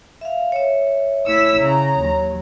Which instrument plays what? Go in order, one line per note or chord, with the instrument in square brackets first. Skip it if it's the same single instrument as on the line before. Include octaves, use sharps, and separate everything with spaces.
[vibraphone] E5 F5
C#5 E5
[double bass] A3 E4 [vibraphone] C#5 [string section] E6 B6
[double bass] C#3 [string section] A#5
[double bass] D#2 F#3